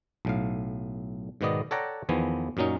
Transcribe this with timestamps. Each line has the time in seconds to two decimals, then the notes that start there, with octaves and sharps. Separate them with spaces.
0.25 B1 A2 F5
1.41 G#2 B2 D#3 B3 D5 D#5
1.71 A4 C#5 D5 F#5 G5 A#5
2.09 E2 D#3 F3 B3 G#5
2.57 F#2 A#2 F#3 C#4 D#4